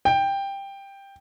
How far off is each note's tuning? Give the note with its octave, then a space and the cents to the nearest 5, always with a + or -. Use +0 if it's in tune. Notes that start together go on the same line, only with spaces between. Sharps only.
G5 +10